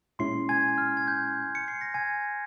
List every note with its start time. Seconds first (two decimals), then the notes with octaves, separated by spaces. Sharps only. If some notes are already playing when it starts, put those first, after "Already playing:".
0.19 A#2 G#3 C#4 E4 C6 C7
0.49 G#5 G#6
0.78 F6
0.97 G#6
1.08 G6
1.55 C#7
1.68 C7
1.81 A#6
1.94 G#5 G#6